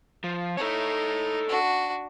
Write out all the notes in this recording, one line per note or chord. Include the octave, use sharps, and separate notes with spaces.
F3
D#4 A4 C#5
D4 F#4